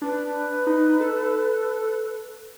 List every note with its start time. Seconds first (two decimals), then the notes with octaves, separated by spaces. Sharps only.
0.02 D4 B4
0.67 D#4
1.00 A4